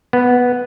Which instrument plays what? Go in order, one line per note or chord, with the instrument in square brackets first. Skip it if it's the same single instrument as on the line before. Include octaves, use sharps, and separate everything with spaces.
[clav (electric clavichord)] B3